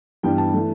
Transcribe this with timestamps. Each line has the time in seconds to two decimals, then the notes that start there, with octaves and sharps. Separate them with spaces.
0.23 G2 E3 G3 B3 G5
0.38 A5
0.54 E3 A3